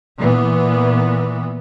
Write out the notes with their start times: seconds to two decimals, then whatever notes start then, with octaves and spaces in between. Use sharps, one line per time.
0.18 A#2 E3 B3